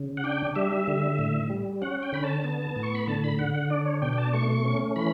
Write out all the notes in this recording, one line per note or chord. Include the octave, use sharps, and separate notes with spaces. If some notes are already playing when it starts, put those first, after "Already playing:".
Already playing: C#3
F#5
D4 G5
G3 E5
D3
A2
G3
C#4 F#5
G5
D3 B5
A5
B3
A2
C#6
B5
D3 A5
B5
D3 F#5
F#5
D4 D5
C#5
B2 G5
G5
A5
A3 C#6
C#4
E3 B5